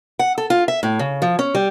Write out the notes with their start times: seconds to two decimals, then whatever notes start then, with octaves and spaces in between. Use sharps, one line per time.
0.19 F#5
0.38 A4
0.50 F4
0.68 E5
0.83 A2
0.99 C#3
1.22 F3
1.39 C#4
1.55 G3